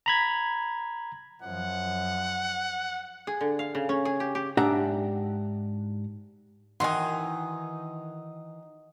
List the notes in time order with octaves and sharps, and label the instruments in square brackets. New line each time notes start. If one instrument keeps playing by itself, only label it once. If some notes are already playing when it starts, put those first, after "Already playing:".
[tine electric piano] A#5 B5 G#6
[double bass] F#2 F3 [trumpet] F#5
[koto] G#4
D3
F5
C#3
C#4
G#4
G4
G4
[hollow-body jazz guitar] G#2 D4 G4 E5 F#5 A#5
[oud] D#3 E3 [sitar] D#4 [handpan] D#5 F#5 [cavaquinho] G#5 C6